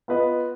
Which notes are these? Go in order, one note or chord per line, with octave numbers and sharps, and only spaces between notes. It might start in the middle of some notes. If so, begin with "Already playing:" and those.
B3 F4 B4 D#5